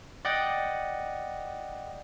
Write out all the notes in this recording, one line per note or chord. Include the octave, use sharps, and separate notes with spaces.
D5 D#5 F#5 G5